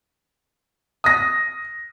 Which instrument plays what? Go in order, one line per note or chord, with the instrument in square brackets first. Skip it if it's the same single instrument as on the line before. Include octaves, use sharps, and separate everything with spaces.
[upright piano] D#6 A#6